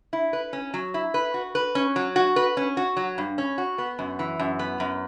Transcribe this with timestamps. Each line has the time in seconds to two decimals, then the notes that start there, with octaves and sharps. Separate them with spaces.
0.13 E4
0.33 B4
0.53 C#4
0.74 F#3
0.94 E4
1.14 B4
1.34 F#4
1.55 B4
1.75 C#4
1.96 F#3
2.16 F#4
2.36 B4
2.57 C#4
2.77 F#4
2.97 F#3
3.18 G2
3.38 C#4
3.58 F#4
3.78 B3
3.99 F#2
4.19 E3
4.39 F#2
4.59 B3
4.80 F#2